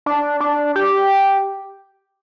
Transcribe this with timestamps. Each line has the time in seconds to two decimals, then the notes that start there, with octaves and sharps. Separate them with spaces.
0.06 D4
0.40 D4
0.76 G4